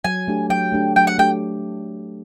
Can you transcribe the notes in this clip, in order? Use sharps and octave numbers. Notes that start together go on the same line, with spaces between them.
F#3 G#5
A3 D4 G4
F#3 G5
A3 D4 G4
F#3 G5
F#5
A3 D4 G4 G5